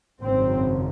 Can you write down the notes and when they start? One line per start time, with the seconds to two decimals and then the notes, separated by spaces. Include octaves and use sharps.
0.21 G#1 F#2 C#3 C4